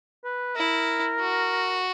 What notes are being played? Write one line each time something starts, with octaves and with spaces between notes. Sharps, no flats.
B4
E4 A#4
F#4